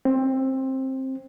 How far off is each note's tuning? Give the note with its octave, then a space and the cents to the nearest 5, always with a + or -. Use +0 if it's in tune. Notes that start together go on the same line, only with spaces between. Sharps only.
C4 +15